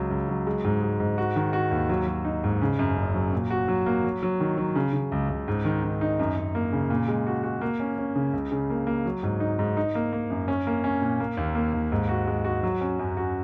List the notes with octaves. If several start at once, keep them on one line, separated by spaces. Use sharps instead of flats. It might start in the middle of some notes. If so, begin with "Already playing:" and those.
Already playing: C#2 F#3
C#2
F#3
G#3
G#2
G#3
G#2
F#4
D#3
F#4
D#2
F#3
F#3
D#4
G#2
C#3
F#2
F#1
F#3
A#2
F#4
F#3
A#3
F#3
F#3
D#3
F#3
C#3
C#3
C#2
C#2
G#2
D#3
D#3
D#4
F#2
F#2
A#3
C#3
A#2
G#3
F#4
F#4
A#3
C#4
C#4
C#3
C#2
C#3
A#3
A#3
F#3
G#2
D#4
G#2
D#4
A#3
A#3
F#2
C#4
A#3
C#4
A#2
A#3
D#2
A#3
D#2
G#2
F#4
G#3
F#4
F#3
C#4
F#2
F#4